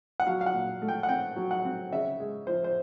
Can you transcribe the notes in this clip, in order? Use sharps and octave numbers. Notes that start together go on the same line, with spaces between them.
F#5
F#3 F5
F5
F#5
A#2
A3
G5
F#5
C4 G5
F#3
F#5
C4
C#3 E5
G#3
F3 C5
C5